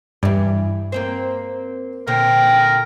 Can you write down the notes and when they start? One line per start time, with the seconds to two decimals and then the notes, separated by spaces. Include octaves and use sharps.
0.23 G2 E3 D5
0.92 A#3 C4 C5
2.08 A#2 D3 C4 A#4 G5